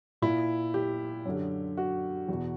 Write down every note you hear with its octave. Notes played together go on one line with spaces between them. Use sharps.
A#2 E4
G4
F#2 D3
F#4
E2 B2